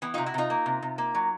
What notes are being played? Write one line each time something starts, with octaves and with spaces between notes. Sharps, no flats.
E3 B3
C3 D#4 F4
E4 F#4
C3 D#4 F4
A#3
C3
C3
A#3
F#3